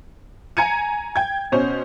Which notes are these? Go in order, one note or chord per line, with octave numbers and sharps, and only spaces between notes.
G#5 A#5 G#6 C#7 D#7
G5 G#6
B2 C#4 C5